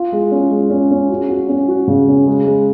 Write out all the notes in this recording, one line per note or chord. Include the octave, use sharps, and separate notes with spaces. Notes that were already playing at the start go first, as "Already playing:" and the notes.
Already playing: F4
G#3
C#4
G#3
C#4
C#4
F#4
F#4
C#4
F#4
C#3
C#4
G#3
G#3